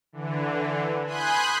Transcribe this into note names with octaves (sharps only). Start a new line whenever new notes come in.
D3 E3
G#5 B5 C6 D#6 F#6 G6